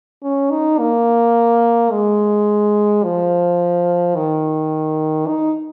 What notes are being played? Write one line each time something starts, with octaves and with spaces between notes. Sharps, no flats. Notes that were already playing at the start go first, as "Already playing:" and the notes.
C#4
D#4
A#3
G#3
F3
D#3
D#4